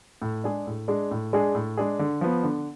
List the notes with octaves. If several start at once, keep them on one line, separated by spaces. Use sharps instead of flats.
A2
G#3 D4 G#4
A2
G#3 D4 G#4
A2
G#3 D4 G#4
A2
G#3 D4 G#4
D3
F3 B3
D3